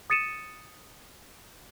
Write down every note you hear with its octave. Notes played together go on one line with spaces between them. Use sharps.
D#6 A6 C#7 D#7 E7